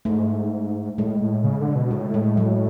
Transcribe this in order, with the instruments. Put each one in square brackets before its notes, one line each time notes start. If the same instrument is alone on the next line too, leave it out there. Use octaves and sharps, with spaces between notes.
[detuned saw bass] G#2 [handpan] A3
[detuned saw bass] A2 [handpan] G#3
[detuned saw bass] A2
C#3
D3
B2
[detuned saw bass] A2 [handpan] G#3
[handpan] G#3
F#3